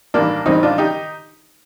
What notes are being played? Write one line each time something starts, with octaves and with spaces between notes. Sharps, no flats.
A1 G2 D#3 A#3 D4
A1 G2 D#3 C4 D#4
D4 F4
D#3 D#4 G4